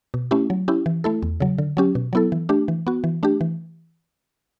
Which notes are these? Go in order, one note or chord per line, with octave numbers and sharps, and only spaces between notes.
B2
A3 C#4 E4 G4
F#3
C#4 E4 G4
E3
A3 E4 A4
E2
C#3 F#3
D3
F#3 C#4 G4
B2
F#3 B3 E4 A4
E3
A3 D4 G4
E3
B3 F#4
E3
A3 D4 G4
E3